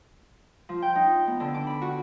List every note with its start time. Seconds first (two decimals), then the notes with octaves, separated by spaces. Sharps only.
0.69 F3
0.82 G5
0.96 D#4
1.28 B3
1.40 D3
1.54 D6
1.67 B5
1.82 F#4